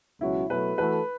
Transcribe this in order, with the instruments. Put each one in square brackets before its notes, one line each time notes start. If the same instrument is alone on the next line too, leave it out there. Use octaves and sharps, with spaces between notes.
[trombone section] C#2 B2 F#3 C#4 F#4 [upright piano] E4
[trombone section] B2 F#3 A3 [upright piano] B4
[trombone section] E3 A3 F#4 A4 [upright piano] B4